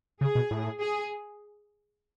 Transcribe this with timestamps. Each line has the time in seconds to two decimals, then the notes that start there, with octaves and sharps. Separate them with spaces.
0.21 C#3 G#4
0.35 B2
0.51 A2
0.80 G#4